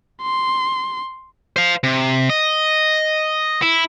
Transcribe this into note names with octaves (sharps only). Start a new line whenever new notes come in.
C6
C5 F5
C3
D#5
E4